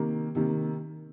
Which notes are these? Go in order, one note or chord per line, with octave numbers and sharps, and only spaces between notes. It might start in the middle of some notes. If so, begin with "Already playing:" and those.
Already playing: C3 D#3 A#3
C3 D#3 A#3